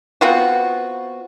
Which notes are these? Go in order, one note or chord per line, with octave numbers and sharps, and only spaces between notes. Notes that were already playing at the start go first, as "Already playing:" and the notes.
B3 C4 F4 F#4